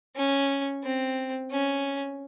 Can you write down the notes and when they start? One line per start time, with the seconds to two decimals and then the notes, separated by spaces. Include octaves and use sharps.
0.16 C#4
0.84 C4
1.51 C#4